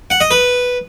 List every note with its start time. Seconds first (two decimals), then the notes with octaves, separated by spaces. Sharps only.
0.10 F#5
0.21 D#5
0.31 B4